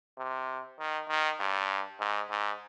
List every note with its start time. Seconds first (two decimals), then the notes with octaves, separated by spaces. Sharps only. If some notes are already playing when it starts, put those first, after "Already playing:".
0.18 C3
0.79 D#3
1.09 D#3
1.40 G2
2.00 G#2
2.30 G#2